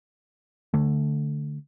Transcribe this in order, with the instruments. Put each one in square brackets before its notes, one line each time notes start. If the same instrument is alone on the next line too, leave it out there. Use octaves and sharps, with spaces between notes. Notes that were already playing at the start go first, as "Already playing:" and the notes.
[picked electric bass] D3 A3